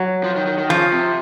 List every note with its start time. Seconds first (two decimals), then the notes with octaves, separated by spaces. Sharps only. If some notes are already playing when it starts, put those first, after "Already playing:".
Already playing: F#3
0.24 F3
0.36 D#3
0.47 D#3
0.58 D#3
0.69 C#3 F3
0.92 C3